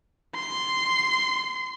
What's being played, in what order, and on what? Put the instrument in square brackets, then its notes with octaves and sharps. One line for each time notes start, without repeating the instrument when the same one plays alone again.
[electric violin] C6